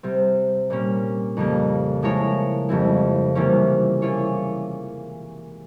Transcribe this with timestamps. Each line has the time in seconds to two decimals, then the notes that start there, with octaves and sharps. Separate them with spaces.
0.03 C3 G3 C4
0.70 A#2 G3 A#3 C#4
1.37 F2 C#3 G3 A#3
2.02 F3 G#3 E4 A#4 C#5
2.69 F2 C#3 G3 C4 E4
3.35 C3 E3 G3 A#3 C#4
4.02 E3 A#3 F4 G#4 C#5